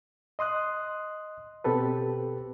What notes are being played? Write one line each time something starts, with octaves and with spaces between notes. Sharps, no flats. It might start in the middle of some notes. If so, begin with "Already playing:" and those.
D#5 C6 D#6 F#6
B2 C4 G4 A4 B4